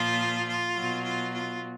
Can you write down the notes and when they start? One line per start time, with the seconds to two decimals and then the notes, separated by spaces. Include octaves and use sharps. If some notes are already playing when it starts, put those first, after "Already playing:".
Already playing: A#2 F3 F4
0.47 F4
0.75 B2 F#3
1.03 F4
1.32 F4